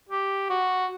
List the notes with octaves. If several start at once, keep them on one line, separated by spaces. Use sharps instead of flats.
G4
F#4